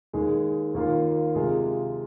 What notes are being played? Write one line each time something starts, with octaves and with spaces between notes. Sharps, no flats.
D#2 D#3 G#3
D#2 D#3 A#3 F4
C3 G#3 F4